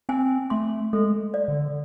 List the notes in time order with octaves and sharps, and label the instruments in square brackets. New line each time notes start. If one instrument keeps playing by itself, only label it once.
[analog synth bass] C4 [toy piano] G#5
[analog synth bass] A3 [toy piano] C6
[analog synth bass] G#3 [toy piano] A4
[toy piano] D5
[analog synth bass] D3